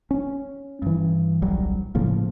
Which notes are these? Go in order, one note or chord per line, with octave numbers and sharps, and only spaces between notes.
C#4
G2 E3
D1 A#1 F#3 G3
A2 C#3 F3 A#3